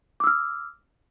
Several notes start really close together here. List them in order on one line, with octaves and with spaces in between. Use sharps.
D6 E6 F6